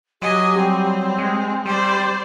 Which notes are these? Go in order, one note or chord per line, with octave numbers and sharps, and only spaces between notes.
F#3 G4 D#5 G#5
G3 C4
G#3
G3 G4 C5 D5